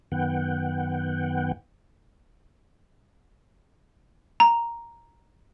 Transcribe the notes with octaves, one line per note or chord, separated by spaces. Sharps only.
F#2 D#3 B3 F#5 G5
A#5